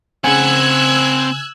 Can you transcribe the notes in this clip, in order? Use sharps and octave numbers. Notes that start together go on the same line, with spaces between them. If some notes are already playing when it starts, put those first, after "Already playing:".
C#3 C4 F#5 G#5 E6 F#6 G#6